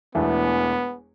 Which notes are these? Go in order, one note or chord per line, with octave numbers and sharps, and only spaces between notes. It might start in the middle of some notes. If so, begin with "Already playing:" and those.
E1 E2 E3 A3 B3 D4